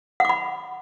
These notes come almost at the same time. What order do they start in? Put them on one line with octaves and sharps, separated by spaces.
F#5 D6 B5